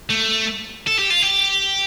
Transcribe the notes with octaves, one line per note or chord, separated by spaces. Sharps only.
A3
A4
G4
F4
G4